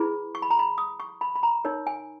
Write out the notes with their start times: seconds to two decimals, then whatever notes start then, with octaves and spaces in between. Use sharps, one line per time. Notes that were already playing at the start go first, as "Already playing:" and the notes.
Already playing: E4 G#4 B4 B5
0.35 C#6
0.42 B5
0.50 A#5
0.59 B5
0.78 D#6
1.00 C#6
1.21 B5
1.35 B5
1.43 A#5
1.65 D#4 A#4 C#5
1.87 G#5